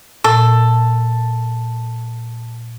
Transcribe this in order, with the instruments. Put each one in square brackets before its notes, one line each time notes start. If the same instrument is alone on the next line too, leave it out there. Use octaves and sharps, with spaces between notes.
[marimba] A#2 [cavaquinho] A4